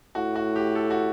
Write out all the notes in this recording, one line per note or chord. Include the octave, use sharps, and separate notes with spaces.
A2 F#4
F#4
G4
A4
F#4